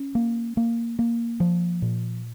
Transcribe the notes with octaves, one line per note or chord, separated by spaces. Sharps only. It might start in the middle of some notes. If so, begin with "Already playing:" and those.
Already playing: C#4
A#3
A#3
A#3
F3
A#2